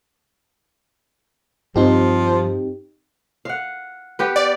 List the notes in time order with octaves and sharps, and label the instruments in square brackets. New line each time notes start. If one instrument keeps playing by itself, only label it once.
[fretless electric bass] G2 [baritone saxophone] F3 [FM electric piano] C4 D#4 G4
[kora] F5 F#5
B3 G4 B4
[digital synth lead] D5